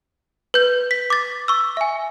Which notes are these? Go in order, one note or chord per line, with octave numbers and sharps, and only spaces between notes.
B4 G6
B6
D6 A6
C#6 E6
E5 G#5